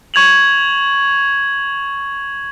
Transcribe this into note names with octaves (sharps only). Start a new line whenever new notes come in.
C#6 G#6 F7 F#7